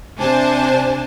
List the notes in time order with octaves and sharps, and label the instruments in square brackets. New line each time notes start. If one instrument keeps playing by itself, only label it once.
[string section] C3 D4 C5 G#5 A5